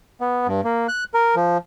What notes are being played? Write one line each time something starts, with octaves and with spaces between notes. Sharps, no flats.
B3
G2
A#3
F#6
A#4
F3